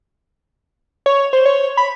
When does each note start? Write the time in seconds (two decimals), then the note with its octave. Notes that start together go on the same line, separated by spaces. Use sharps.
1.06 C#5
1.33 C5
1.46 C#5
1.77 B5